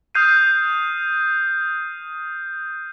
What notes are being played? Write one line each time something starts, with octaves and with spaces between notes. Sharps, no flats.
D#6 F6 G6 C7 D#7